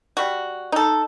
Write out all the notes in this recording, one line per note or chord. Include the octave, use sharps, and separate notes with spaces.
G3 F#4
D#4 A4